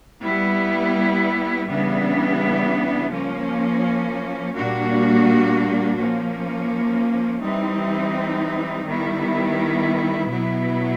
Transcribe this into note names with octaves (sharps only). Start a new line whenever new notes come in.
G3 B3 E4
C#3 E3 G3 B3 D4
F3 A#3 C#4
A#2 G3 A#3 D4 F#4
F3 A#3 C#4
E3 G3 C4 D#4
D#3 G3 B3 E4
B2 F#3 B3 E4